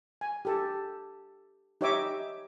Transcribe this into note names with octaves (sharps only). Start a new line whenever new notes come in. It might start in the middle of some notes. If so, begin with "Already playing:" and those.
G#5
G4 A4
D#4 G4 C#5 D#5 E5 D6